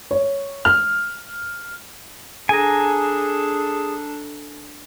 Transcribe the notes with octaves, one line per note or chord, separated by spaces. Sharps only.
C#5
F6
D4 G#4 A4 G#5 A#5